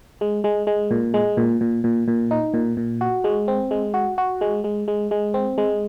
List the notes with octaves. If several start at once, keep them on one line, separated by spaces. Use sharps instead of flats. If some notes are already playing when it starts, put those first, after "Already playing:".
G#3
G#3
G#3
A#2
G#3
A#2
A#2
A#2
A#2
D#4
A#2
A#2
F#4
G#3
C4
G#3
F#4
F#4
G#3
G#3
G#3
G#3
C4
G#3